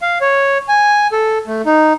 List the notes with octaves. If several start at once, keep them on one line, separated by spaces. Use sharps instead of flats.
F5
C#5
G#5
A4
A3
D#4